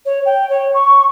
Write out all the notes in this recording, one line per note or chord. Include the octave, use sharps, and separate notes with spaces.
C#5
G5
C#5
C#6